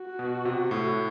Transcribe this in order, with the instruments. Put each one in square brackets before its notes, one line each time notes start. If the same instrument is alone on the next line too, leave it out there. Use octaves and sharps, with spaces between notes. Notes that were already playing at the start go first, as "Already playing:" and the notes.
Already playing: [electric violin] F#4
[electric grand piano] B2
C3
A2